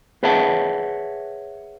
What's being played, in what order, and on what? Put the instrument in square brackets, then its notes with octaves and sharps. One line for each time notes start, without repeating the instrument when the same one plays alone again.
[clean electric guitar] G#4 B4 C#5 E5 F#5 A5